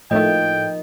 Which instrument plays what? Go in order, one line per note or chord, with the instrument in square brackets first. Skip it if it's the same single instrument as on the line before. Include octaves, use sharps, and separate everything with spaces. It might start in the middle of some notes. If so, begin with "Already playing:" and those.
[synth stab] A2 A3 [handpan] F3 A#3 D#4 [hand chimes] D#5 [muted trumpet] G5